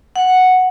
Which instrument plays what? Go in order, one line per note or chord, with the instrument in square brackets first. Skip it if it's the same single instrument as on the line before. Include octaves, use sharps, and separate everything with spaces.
[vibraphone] F#5